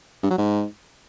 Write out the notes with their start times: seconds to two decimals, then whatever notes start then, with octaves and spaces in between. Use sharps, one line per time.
0.23 G2
0.31 F#3
0.38 G#2